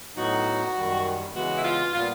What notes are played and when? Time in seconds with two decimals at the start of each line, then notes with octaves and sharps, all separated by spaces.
0.15 A2 F#3 B3 D#4 F#4
0.75 F#2 D#3 G3
1.34 C#3 E3 G#3 B3 F#4
1.55 E4
1.63 F4
1.92 A#2 G3 B3 F4